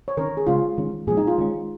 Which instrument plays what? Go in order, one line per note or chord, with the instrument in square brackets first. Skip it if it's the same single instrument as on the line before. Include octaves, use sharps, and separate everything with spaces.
[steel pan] C#5
[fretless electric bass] D#3 C#4 [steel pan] A#4
[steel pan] G#4
[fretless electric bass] C#3 G#3 C#4 [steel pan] F4
[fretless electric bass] D#3 G#3 C#4
[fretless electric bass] A#2 F3 G#3 C#4 [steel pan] G#4
[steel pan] D#4
F4
[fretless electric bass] D#3 G#3 C#4